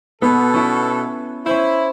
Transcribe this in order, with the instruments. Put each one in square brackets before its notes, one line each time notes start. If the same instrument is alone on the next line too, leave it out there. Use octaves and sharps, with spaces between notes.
[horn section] B2 A4 [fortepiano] B3
[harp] C#4 E4
[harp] C#4 C5 [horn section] E4